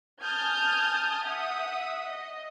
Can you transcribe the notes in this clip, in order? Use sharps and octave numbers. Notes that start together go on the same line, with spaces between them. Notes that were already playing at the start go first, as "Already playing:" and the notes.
G#5 A5 D#6 F6 G6 G#6
E5 F#5 D#6
D#5